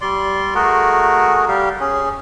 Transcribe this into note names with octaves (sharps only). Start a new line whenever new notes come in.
G3 D5 C6
A3 F#4 G#4 A#4
G3 G4 F5
C#4 G#4